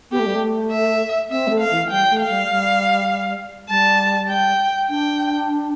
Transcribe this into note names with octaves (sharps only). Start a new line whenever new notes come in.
B3 G4
A3
G3
A3
E5
C4 E5
G3
A3
F5
E3
G3 G5
A3
F5
G3
G3
G3 A5
G5
D4 G5